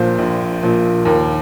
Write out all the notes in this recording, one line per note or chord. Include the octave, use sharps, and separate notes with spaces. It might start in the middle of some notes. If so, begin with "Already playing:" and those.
Already playing: A#1 A#2 F3 C5
A#1
A#2 F3
D#2 A#4